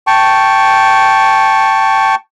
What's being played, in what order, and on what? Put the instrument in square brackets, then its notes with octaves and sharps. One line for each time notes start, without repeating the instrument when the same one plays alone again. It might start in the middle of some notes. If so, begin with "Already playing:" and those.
[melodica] G5 A5 C#6